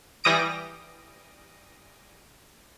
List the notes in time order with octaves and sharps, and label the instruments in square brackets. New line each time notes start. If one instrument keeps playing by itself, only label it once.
[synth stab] E3 G3 D#6 A#6 D7